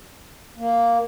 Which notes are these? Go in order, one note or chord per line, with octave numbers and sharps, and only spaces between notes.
A#3